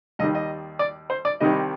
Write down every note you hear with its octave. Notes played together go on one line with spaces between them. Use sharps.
D#2 D#3 G3 D#5
D#5
D5
C5
D5
C2 C3 D#3 G3 D#5